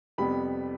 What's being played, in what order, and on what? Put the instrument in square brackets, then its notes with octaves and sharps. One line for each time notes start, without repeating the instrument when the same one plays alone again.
[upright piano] F2 C3 G3 B3 B5